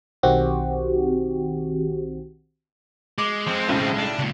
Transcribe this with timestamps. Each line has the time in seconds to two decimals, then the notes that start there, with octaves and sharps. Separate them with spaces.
0.23 B1 D#3 C4 F#4 G4
3.18 G#3 D6
3.47 F3 C4
3.69 B1 A2 C#3
3.99 D4
4.19 C#2 A#2